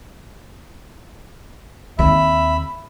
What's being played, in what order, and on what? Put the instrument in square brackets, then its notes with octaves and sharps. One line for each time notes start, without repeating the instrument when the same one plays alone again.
[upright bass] D#2 C4 [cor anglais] E5 [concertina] B5